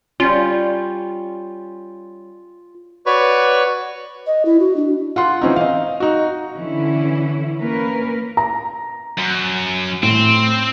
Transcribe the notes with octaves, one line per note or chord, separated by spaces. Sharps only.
G3 C#4 F4
F#4 B4 C#5 D5 B5 C#6
D#5
E4
F#4
D4
F4 F#5 C6
E3 C4 C#4 D#4
D#5 F5
D#4 F#4
D3 E3 C#4 E4
A#3 C#4 A#4 B4
A#5
F#2
A2 C4